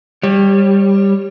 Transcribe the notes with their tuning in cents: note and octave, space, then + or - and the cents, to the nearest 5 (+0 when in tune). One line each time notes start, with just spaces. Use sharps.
G3 +10 C#5 -25